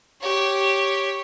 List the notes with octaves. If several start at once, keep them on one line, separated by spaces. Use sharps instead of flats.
G4 C#5